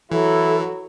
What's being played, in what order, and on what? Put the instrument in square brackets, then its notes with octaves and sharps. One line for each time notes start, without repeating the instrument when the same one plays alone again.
[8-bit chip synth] E3 [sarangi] F#3 [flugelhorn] E4 [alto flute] A4